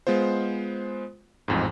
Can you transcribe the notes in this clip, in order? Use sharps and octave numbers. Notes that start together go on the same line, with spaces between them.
G#3 B3 F4 C5
A1 F2 G#2